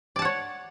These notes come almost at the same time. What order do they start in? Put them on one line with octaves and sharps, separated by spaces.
D5 A5 F#5 C#5